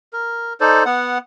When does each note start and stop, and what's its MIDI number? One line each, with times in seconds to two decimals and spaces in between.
0.13 0.53 70
0.60 0.84 63
0.60 0.84 69
0.60 0.84 72
0.60 0.84 74
0.86 1.18 59
0.86 1.18 78